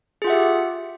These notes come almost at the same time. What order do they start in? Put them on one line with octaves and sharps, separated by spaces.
G#4 F4 F#5 E5 G4